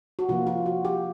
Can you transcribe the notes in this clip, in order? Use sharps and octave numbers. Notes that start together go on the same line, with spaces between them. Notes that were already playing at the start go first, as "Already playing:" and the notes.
F#4
C3 F3 A#3 F4
F4
F#4
G4